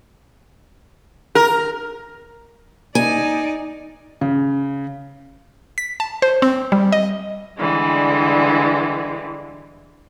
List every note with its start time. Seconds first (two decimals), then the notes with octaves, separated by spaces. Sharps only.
1.35 A#4
2.95 D#4 D5 G#5
4.21 C#3
5.78 B6
6.00 A5
6.22 C5
6.42 C4
6.72 G3
6.92 D#5
7.58 D3 E3 G3 G#3